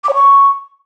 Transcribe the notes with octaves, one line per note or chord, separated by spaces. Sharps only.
D6
C#5
C#6